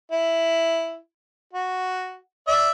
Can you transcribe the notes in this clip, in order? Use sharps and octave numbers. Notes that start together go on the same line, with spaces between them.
E4
F#4
D5 E5